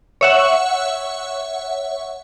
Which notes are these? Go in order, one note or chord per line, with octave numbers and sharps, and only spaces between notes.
C#5 E5 F#5